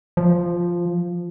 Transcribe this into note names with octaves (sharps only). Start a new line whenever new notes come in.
F3